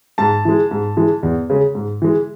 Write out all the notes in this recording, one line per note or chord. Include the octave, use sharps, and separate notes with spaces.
G#2 A5
E3 G#3
G#2
E3 G#3
E2
C#3 G#3
G#2
E3 G#3